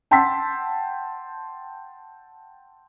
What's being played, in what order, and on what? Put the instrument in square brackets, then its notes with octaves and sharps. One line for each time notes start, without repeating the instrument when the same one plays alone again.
[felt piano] F#5 G5 A5 C6 E6 B6